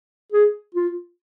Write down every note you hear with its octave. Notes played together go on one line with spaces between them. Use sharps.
G#4
F4